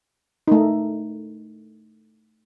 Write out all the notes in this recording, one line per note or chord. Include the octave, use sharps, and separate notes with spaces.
A3 D#4